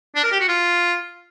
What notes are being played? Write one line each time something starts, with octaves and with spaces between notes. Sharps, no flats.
D4
A#4
G4
F#4
F4